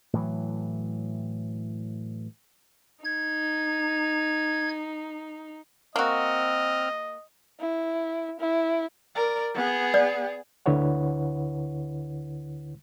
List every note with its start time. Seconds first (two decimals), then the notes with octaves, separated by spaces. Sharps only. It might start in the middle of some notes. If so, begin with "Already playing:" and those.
0.13 A2 E3 F#3
3.04 D#4 G#6
5.96 A#3 C4 F#4 D#5 F6
7.60 E4
8.40 E4
9.15 A#4 D5
9.54 B3 G#4
9.94 D5
10.66 D2 D3 E4 B4 C#5 F#5